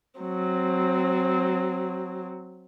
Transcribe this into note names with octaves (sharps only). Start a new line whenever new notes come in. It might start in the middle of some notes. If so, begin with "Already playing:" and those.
F#3 C4